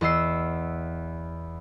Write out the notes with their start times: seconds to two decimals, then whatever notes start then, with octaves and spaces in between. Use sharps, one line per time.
0.01 E2 D#5 E6 C7